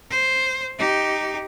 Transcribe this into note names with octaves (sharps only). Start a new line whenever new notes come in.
C5
D#4 G4